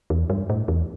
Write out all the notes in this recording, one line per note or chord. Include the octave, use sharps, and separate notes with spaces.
E2
G2
A2
E2